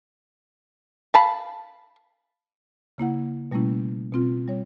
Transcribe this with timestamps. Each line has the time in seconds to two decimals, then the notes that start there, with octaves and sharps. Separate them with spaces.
1.14 F5 A5 B5
2.98 C#3 A#3 E4 F#5
3.51 B2 G3 A3 A#3 C#4 E4
3.73 C#4
4.13 B2 C4 F4
4.48 G3 C#5